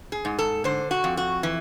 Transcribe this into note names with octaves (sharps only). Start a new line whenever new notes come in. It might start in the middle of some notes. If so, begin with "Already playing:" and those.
G#4
G#2
A4
D3 C5
F#4
F2
F#4
E3